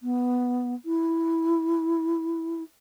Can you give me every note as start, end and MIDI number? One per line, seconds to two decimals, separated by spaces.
0.01 0.74 59
0.85 2.63 64